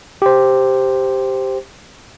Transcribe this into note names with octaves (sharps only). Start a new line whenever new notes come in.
G4 C5